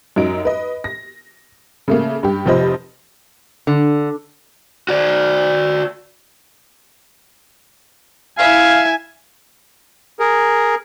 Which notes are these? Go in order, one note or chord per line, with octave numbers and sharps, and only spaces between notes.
F#2 F#3 D#4 D7
B4 D#5
A#6
C#3 A3 A#3
G2 G4
F1 C3 F3 C5 D#5 B5
D3
F#4 D5
E4 E5 F5 G#5
G#4 A#4